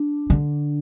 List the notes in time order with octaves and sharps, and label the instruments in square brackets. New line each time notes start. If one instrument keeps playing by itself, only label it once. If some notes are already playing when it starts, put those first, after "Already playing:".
Already playing: [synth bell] D4
[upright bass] D3